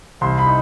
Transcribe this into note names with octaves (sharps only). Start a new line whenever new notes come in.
C2 C6
B5
D#4